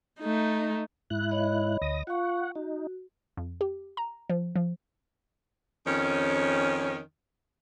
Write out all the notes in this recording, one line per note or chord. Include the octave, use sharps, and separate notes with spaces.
A3 D#4
G#2 E4 F#6
C#5 D#5 B5
D2 D#6 A#6
F4 F5 F#5 C#6
D#4 F#4
F2
G4
A#5
F3
F3
F2 D#3 C#4